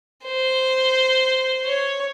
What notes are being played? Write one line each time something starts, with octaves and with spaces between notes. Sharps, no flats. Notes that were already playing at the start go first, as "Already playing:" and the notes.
C5
C#5